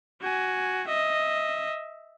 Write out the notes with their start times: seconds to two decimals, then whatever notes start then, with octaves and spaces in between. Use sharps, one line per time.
0.22 F#4 G#5
0.88 D#5 E5